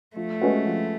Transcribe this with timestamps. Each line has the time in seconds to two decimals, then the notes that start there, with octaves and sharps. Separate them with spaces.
0.16 F3 A3
0.42 G#3 C#4 F#4 B4
0.65 F3